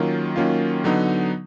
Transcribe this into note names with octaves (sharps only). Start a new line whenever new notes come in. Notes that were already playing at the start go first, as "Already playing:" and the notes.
Already playing: D#3 F#3 A#3 C#4 F4
D#3 F#3 A#3 C#4 F4
D3 F#3 B3 D#4